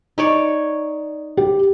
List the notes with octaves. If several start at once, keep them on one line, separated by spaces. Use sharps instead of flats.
D#4 C#5 D5
G4